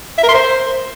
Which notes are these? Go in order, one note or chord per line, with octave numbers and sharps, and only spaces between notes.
E5
A#4
C6
C5